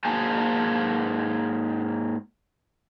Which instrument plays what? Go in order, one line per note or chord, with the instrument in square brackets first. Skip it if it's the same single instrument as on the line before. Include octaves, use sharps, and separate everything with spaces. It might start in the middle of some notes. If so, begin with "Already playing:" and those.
[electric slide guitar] G#2 A#3 G#4 C5 G#5 A5